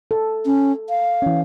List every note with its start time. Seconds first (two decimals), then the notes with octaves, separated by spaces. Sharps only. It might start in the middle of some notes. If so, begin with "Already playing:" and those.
0.11 A4
0.46 C#4
0.89 F5
1.22 E3 C#4